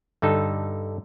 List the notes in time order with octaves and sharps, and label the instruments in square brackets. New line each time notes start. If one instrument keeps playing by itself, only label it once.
[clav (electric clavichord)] G2 D3 D#4 A4